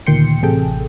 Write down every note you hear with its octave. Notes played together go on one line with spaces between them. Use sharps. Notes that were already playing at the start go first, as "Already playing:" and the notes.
D2 A#2 D#3 G5 C6 C#7
A1 C3 G#4 A4 G5